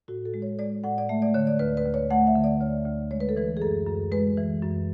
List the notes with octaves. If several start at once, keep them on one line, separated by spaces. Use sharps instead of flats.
A2 F#4
A4
G#3
C#5
G#3 D5
A2 F#5
D5
A3 E5
D5
D3 C#5
D5
D2 B4
B4
D2
C#5
A3 F#5
E5
D3
D5
D2 C#5
D2
G#3 C#5
B4
A4
E3 B4
G#4
F#2 A4
F#2
G#3 B4
E3
F#2